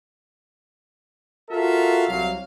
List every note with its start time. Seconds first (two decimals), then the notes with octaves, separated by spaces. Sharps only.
1.50 F4 F#4 A4 A#4 E5 F5
2.08 C2 F#3 F5